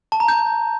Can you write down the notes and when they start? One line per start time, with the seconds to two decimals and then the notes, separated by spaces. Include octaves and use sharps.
0.12 A5
0.20 A#5
0.28 G6